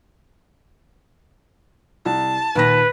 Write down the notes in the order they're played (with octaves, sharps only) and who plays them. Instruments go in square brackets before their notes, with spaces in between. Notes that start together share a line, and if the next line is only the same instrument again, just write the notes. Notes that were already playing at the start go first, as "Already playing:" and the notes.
[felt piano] C2 [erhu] A5
[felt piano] D#2 A#6 [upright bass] A#2 F4 [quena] B4